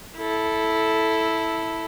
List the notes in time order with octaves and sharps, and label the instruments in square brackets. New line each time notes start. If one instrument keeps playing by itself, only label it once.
[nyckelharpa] E4 A4